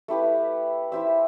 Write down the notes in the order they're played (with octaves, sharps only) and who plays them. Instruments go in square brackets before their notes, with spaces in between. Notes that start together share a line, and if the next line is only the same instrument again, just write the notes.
[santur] A3 E4 G4 B4
E4 G4 C5 E5